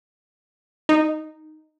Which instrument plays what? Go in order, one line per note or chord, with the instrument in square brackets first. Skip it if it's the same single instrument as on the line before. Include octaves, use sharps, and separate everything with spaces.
[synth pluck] D#4